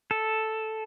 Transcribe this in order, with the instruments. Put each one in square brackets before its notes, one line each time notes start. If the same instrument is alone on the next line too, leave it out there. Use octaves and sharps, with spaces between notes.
[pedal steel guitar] A4